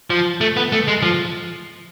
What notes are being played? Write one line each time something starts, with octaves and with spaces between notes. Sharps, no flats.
F3
A3
B3
A3
G#3
F3